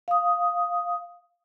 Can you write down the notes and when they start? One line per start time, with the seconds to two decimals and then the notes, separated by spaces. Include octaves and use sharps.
0.08 F5 D#6